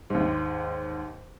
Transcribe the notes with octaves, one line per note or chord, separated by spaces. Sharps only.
D#2 G#2